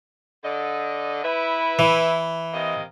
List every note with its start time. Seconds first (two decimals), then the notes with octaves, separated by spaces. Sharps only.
0.45 D3 D#5
1.24 E4 B4
1.79 E3
2.53 C3 A#3 D#5